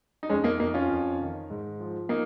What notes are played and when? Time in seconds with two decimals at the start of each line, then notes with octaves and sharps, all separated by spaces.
0.23 D#4
0.29 F2 G#3 C#4
0.44 A#3 D#4
0.59 F2 A#3 D#4
0.74 C#4 F4
0.89 F2
1.20 D#3
1.50 G#2
1.80 F3
2.09 A#3 D#4